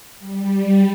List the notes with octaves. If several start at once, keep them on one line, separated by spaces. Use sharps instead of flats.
G3